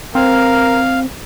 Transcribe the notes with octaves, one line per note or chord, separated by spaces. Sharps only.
C4 A#4 F5